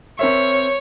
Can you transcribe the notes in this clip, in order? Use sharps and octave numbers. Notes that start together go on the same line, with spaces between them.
C4 A#4 C#5 E5